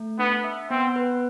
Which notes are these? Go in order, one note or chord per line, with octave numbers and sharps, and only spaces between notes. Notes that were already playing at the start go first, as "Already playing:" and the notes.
Already playing: A3
B3 D4
E5
B3 C4
B4